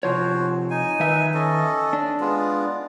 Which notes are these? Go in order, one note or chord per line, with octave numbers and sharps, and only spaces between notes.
C3 F3 F#4 C5 C#5
D#4 G#5
D#3 B4 E5
C#4 A4 D#5
D4
G#3 B3 F4